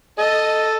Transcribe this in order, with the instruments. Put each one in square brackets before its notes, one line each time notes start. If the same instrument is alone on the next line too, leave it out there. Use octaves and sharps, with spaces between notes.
[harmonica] A4 [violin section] D#5